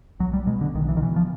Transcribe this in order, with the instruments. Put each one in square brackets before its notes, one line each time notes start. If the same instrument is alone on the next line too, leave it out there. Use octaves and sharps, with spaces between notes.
[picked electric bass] B1 F#3
G3
B2 G#3
D3
B1 D#3
E3
D#3
B2 E3
F3